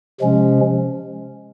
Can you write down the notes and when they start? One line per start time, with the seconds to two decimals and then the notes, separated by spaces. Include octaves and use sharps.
0.20 C3 F3 G#3 C#4